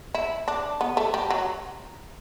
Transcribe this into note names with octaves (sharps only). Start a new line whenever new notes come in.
E4
D4
B3
A3
G3
F#3